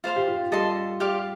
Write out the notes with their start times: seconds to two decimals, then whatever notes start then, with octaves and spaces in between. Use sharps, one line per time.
0.04 F4 C5 F5 C6
0.16 G4
0.28 F4
0.52 G3 A4 D#5 A5 C6
1.00 G4 D5 F5 C6